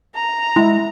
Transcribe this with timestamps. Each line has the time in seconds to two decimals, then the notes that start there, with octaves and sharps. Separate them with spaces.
0.15 A#5
0.56 G#3 E4